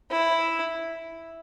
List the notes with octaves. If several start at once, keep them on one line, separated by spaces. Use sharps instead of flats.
E4